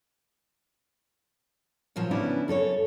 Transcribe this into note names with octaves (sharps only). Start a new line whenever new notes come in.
A#2 C#3 F3 F#3
C#3 B3 C#4 D4 E4
F#2 A4 A#4 C#5